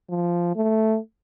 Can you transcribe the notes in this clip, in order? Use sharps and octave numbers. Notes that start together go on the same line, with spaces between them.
F3
A3